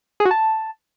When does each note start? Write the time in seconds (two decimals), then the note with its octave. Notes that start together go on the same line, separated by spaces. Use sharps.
0.20 G#4
0.25 F#4
0.31 A5